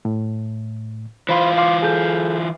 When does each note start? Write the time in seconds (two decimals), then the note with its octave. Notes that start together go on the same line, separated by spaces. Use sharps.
0.05 A2
1.29 E3 F4 C5 B5 C6
1.58 F5 C6 D6
1.83 G#4 A4 G6